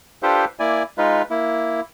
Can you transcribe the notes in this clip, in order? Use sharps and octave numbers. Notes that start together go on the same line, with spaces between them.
D4 F4 G4 A4 B4 C5
A#3 E4 D5 G#5
G#3 D#4 F4 B4
A#3 E4